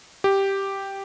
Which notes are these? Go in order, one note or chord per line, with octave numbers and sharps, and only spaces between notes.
G4